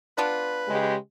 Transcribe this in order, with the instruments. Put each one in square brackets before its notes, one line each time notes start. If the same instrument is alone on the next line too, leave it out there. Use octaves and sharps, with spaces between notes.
[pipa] B3 D4 F4 [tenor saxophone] B4
[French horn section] C#3 G#3 G4